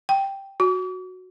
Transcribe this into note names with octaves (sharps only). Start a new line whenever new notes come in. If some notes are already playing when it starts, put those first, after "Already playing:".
G5
F#4